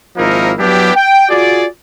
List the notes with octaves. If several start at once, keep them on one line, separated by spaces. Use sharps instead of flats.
G#1 F3 A#3 D#4 E4 A#4
F#3 B3 D4 E4 G4
G5
F4 F#4 G#4 D5